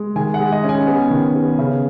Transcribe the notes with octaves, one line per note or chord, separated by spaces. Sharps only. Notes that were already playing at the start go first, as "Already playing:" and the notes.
Already playing: G#3
D#3 G#5
F#5
G#3
D#5
C#4 G#5
B3
D#3
B3
C#3